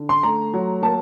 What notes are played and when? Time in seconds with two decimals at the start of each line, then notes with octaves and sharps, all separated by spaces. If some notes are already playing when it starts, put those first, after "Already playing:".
Already playing: D3
0.09 C6
0.23 A3 A#5
0.54 F#3
0.82 A#3 A5